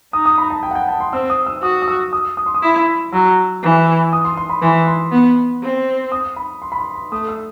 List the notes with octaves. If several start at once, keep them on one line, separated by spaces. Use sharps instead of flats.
D#4 D#6
D#6
B5
A5
G5
F#5
G5
A5
C6
C4 E6
D#6
E6
F#4 D#6
D#6
E6
D#6
D#6
C6
D#6
E4
F#3 E6
E3
D#6
C6
C6
B5
E3 C6
C6
B3
C4
D#6
B5
C6
B5
C6
C6
A3 D#6
E6